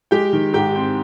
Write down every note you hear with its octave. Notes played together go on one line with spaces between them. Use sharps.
G#3 G4 G5
D#3
G#2 G4 G5
C4